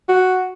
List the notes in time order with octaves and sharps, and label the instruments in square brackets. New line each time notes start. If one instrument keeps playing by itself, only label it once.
[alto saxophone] F#4